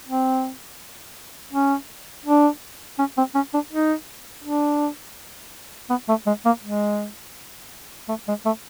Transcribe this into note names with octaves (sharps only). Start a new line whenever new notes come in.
C4
C#4
D4
C#4
C4
C#4
D4
D#4
D4
B3
A3
G#3
A#3
G#3
A3
G#3
A3